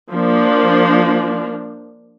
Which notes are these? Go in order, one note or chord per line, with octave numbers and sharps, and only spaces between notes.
F3 A#3 D4